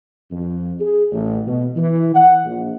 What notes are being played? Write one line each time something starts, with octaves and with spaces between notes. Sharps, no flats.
F2
G#4
A1
B2
E3
F#5
A#1